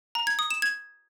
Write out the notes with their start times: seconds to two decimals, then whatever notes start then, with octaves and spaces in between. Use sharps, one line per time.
0.15 A#5
0.27 G#6
0.39 D#6
0.50 E7
0.62 G#6